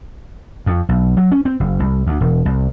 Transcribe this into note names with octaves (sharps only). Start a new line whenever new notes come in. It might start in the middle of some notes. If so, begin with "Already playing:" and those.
F2
B1
F#3
C#4
C4
F#1
C2
D2
E1
C2